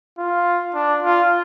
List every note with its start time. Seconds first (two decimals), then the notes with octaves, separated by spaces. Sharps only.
0.18 F4
0.75 D4
1.03 F4